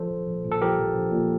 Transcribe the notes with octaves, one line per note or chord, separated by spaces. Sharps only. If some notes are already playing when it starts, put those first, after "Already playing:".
Already playing: F3 A4 C5
A#1
A#1
A#2
A4
F3 G4 A#4
A#1
A#1
A#2